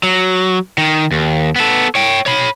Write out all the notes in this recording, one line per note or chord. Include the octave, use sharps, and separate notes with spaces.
F#3
D#3
D#2
B3 A4
C#5 G5
C#5 B5